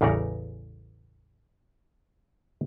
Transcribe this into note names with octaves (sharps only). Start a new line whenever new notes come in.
A1 E2 C#3 G3 A#4 F#5